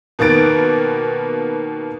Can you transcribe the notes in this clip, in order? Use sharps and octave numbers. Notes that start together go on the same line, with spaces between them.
B2 D#3 A#3 B3 A6 D7